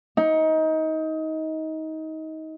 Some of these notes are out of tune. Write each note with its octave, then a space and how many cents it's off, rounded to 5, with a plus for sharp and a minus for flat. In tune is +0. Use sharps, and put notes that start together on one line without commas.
D#4 +25